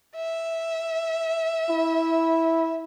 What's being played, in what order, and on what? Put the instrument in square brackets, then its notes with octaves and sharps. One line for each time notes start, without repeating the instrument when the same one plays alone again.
[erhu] E5
[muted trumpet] E4